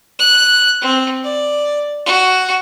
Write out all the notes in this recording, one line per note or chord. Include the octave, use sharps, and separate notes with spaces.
F#6
C4
D5
F#4